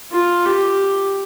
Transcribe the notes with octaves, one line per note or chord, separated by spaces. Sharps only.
F4
G4